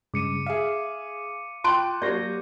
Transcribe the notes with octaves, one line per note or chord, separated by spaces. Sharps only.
G2 C#3 G#3 D6 C#7 D#7
G#4 E5 F5 C#7
F4 G5 A5 C6 C#6 F#6 D7
F#3 A#3 G4 D5 G6 A#6